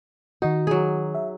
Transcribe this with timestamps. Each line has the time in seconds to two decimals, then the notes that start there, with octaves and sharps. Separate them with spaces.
0.42 D#3 D#4 F#4
0.67 F#3 G#4
1.15 E5